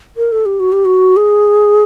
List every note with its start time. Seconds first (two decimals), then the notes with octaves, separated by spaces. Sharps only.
0.17 A#4
0.32 A4
0.46 G4
0.60 F#4
0.72 G4
0.85 F#4
1.17 G#4